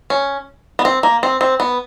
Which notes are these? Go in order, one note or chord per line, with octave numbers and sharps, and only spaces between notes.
C#4
B3
C4
A#3
C4
C4
B3